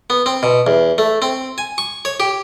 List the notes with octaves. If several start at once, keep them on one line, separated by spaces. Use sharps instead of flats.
B3
C4
B2
E2
A3
C4
G#5
C#6
C#5
G4